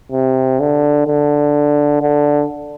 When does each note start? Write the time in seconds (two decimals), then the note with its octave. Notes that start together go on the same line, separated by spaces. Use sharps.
0.12 C3
0.60 D3
1.07 D3
2.01 D3